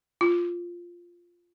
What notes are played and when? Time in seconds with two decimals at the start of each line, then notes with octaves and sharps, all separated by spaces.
0.21 F4